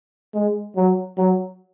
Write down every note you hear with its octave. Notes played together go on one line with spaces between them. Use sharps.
G#3
F#3
F#3